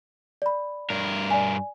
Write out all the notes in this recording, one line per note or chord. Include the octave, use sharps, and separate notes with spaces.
D5 B5
G2 A#4
D5 G#5